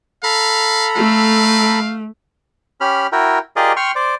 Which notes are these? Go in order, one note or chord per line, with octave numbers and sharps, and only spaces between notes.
A4 F5 A#5 B5
A3 F5
C#4 G4 B5 F6
E4 F#4 A#4 G5
F4 G4 G#4 A#4 D5 D#5
G5 C6 C#6 F6
C5 D5